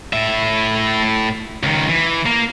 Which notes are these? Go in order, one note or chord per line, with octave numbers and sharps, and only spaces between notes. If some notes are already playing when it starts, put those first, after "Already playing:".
A2 E5
C#2 D#3
E3
A#3